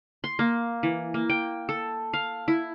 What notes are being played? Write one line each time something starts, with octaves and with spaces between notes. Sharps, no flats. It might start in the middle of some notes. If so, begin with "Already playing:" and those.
C6
A#3
E3
A#3
G5
A4
F5
E4